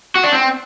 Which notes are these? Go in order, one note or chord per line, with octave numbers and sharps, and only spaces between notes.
F#4
D4
C4